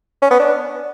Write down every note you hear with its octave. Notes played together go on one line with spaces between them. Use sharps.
C#4
B3
D4